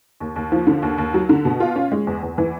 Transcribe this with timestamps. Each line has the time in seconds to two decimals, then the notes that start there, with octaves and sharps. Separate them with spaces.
0.20 D#2
0.36 D#2
0.52 F3
0.67 D3
0.82 D#2
0.98 D#2
1.14 F#3
1.29 D3
1.45 B2
1.60 F4
1.76 C#4
1.92 G#3
2.07 E2
2.23 E2
2.38 E3